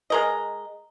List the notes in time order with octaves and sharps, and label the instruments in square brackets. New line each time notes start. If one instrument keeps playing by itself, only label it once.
[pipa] G#3 A#4 D#5